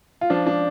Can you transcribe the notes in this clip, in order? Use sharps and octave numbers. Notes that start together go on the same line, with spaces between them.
F4
F3 D4
D4